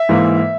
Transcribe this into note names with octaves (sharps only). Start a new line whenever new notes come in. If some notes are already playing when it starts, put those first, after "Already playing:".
Already playing: E5
G#2 E3 A#3